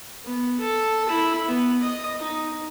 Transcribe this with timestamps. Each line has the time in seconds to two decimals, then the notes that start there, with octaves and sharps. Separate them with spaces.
0.25 B3
0.60 A4
1.09 E4
1.47 B3
1.82 D#5
2.20 D#4